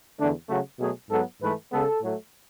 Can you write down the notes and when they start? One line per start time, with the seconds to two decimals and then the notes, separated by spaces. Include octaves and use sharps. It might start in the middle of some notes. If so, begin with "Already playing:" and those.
0.19 E2 D3 A3 D4
0.49 C#3 F#3 A3 F#4
0.79 B2 F#3 A3 G#4
1.10 G#2 F#3 B3 A4
1.41 G#2 E3 A3 B4
1.71 C#3 G#3 B3 A4
2.02 A2 F#3 A3